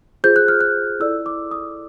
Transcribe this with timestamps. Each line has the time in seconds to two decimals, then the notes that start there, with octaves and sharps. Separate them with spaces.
0.24 F4 G#4 C5 G6
0.36 F#6
0.48 F6
0.61 F#6
1.00 E4 A4 D5 E6
1.26 D6
1.51 D#6